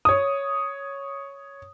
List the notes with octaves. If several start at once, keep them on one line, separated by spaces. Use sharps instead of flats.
C#5 D#6